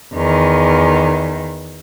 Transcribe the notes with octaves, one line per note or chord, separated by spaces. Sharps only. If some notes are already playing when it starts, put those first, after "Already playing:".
E2 D#3